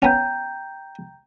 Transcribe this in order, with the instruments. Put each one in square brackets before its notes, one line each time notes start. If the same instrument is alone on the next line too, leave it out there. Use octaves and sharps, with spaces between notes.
[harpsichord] B3 C#4 [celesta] G5 A#5 G6